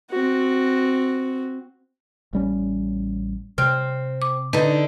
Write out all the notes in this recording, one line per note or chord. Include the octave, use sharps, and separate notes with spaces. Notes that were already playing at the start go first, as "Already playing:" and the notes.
C4 F#4
A1 G3 C#4
C3 C4 F6
D6
D3 D#4 B4